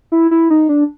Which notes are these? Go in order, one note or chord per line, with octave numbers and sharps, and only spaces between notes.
E4
E4
D#4
D4